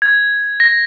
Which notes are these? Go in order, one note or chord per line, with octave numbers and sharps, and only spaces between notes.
G#6
A#6